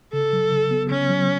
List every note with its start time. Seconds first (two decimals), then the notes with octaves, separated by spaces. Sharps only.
0.13 C#3 A4
0.33 F#3
0.51 C#3
0.71 B3
0.90 C#3 C#4
1.09 F#3